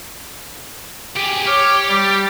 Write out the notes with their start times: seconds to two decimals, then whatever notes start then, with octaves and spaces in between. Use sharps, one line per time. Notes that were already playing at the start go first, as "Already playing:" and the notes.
1.16 G4 G#4
1.46 G4 C#5 D6 F6
1.89 G3